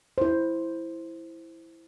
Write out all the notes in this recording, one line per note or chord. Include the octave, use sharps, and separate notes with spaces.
E4 C5